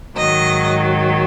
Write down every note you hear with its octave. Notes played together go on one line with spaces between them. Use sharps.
G#2 D#3 F#3 D#5